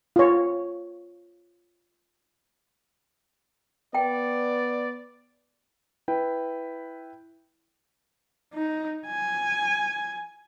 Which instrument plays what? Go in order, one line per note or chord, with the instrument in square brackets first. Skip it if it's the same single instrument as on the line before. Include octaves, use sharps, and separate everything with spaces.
[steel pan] F4 C#5
[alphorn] B3 [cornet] D5 [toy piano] G5
[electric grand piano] E4 B4 G5
[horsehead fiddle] D#4
G#5